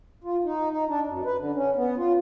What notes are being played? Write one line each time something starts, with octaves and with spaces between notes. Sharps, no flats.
F4
D#4
D#4
D4
F#2
B4
D3
C#4
B3
F4